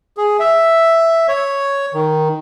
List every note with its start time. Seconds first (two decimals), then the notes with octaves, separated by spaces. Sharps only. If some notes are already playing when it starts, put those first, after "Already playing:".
0.17 G#4
0.39 E5
1.28 C#5
1.94 D#3